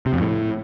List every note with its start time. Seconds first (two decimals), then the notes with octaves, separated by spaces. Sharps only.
0.06 C3
0.13 F2
0.20 A2